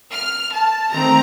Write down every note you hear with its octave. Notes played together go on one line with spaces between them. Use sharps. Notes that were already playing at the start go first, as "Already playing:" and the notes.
F6
A5
D#3 A3 C4 A#5